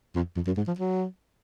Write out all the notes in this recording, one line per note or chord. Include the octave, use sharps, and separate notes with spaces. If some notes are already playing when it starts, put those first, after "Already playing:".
F2
F2
F#2
G#2
F3
F#3